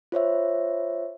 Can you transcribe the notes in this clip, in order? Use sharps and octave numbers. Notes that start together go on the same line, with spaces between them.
F4 C5 C#5 E5